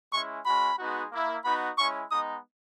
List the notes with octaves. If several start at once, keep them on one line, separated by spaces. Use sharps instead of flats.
G#3 C#4 E4 C#6
G#3 C#4 F#4 B5
G#3 B3 D#4 F#4
A#3 E4
B3 D#4 F#4 B5
G#3 C#4 E4 C#6
G#3 B3 D#4 D#6